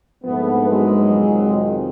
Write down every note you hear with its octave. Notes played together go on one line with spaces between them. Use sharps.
A#1 G#2 F3 A3 B3
F#3 G#3
F2 C3 D#3